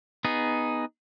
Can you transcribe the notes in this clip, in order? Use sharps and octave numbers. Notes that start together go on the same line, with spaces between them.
B3 D#4 G#4